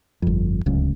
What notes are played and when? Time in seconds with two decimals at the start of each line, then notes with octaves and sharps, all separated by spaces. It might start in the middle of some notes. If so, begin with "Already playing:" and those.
0.22 G1 F2
0.66 D1 C#2